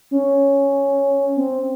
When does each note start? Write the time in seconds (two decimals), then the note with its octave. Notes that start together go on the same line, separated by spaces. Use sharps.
0.11 C#4
1.36 C4